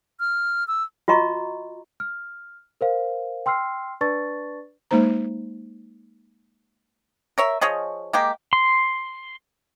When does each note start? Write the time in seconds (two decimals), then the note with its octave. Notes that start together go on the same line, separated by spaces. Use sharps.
0.20 F6
0.68 E6
1.08 F4 F#4 D#5 A#5 C#6
2.00 F6
2.81 A#4 C5 F5
3.46 G5 C6 E6 F6 C7
4.01 D4 B4 D5 A5 C#6 A6
4.91 G#3 A#3 D#4 C5 A#5
7.38 A#4 C#5 E5
7.61 F3 G#4 C#5 D#5
8.13 G#3 A#3 G4
8.53 C6